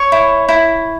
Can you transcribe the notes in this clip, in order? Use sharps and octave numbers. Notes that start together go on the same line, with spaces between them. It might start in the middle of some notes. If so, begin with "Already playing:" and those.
Already playing: C#5 C#6
E4
E4